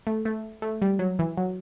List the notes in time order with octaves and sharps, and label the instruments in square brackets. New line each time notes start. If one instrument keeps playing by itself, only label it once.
[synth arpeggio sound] A3
A3
A3
G3
F#3
E3
F#3